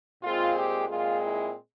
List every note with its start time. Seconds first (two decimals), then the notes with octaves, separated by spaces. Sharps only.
0.23 A#2 G#3 C4 F4
0.55 G4
0.88 A#2 G#3 C4 F4
1.22 E4